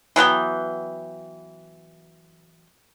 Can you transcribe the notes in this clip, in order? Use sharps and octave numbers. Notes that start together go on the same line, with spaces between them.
E3 F#3 B3 G5